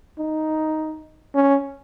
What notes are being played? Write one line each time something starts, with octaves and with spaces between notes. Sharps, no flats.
D#4
C#4